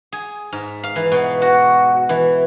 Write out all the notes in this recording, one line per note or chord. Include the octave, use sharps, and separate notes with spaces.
G#4
G#2
F5
E3
B2
F#4
E3